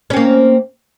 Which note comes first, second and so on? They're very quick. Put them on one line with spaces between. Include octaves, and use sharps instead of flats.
C#4 C4 A#3